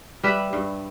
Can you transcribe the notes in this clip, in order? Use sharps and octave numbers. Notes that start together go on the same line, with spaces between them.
G3 B4 E5
G2